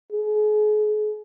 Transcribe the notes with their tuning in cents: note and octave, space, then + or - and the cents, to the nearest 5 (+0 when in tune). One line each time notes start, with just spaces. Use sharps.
G#4 +35